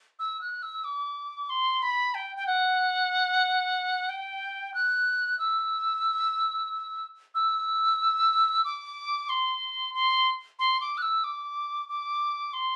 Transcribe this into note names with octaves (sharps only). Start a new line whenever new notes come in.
E6
F#6
E6
D6
C6
B5
G5
G5
F#5
G5
F#6
E6
E6
D6
C6
C6
C6
D6
F#6
E6
D6
D6
C6